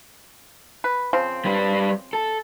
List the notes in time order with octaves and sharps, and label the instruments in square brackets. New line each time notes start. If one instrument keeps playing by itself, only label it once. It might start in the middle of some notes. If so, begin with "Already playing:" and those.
[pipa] B4
C#3 F3 C4
[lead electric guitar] G3 B4
A4